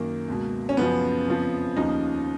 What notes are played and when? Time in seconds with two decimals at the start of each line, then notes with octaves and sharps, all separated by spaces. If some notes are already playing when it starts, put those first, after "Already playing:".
Already playing: F#2 D#3 A#3
0.28 C#2 B2
0.69 C#4
0.77 F#2 C#3 F3 B3
1.27 F2 C#3 F3
1.76 D#2 C#3 F3 D#4